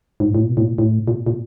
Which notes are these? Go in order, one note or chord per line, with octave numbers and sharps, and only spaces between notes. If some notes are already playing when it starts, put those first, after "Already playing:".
G#2
A2
A#2
B2
A2
A#2
A2
A#2
A#2